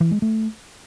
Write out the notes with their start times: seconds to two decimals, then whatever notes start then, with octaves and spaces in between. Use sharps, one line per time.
0.01 E3
0.11 G#3
0.22 A3